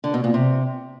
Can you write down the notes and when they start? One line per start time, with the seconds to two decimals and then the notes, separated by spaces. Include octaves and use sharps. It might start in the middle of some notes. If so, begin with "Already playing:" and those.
0.04 D3
0.14 B2
0.24 A#2
0.34 C3